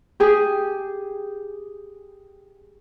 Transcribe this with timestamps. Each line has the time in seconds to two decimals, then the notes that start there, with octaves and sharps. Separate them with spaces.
0.20 G4 G#4